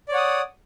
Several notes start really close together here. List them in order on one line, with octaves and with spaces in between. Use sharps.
D5 C#5 F#5 D#6